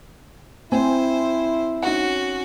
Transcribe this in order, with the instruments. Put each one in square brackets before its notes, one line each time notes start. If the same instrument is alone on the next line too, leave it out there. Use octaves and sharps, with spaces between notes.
[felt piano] C4 [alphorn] E4 [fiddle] C5 [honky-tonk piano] G#5
[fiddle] C#4 F#4 [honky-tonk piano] D#4 F#5